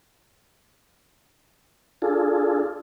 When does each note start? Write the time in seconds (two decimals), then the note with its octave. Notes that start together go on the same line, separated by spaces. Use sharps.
2.02 D4 F4 G#4 A4